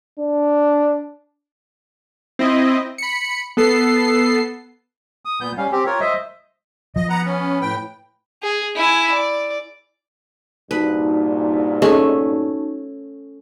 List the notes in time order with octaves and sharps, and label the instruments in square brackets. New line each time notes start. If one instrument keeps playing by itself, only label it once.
[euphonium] D4
[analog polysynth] C4 E4 D#5
B5 C#7
B3 A4 C7
[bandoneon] D#6
A#2 B3 G6
G3 C#4 F5
C4 G4
F4 A#4 C#5
C5 D#5 E5
[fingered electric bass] F3 [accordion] D#5
[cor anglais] B3 [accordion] F#5 A#5
[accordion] C#4
[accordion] A2 G5 [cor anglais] B4
[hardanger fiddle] G#4
E4 G#5
D5
[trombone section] C2 G2 A#2 [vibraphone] D#4 F#4 A5 [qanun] B4
[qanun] A3 C#4 [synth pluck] G#4 D#5